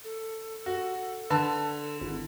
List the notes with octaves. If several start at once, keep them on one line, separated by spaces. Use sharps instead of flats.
A4
F#4
D3 B4 A5
G#1 E4